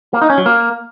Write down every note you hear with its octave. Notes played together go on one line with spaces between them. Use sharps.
A#3
D#4
C#4
F#3
A#3